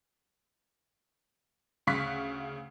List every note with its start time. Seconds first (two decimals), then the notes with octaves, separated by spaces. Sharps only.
1.87 D2 C#3 F5 C#6 F#6 B6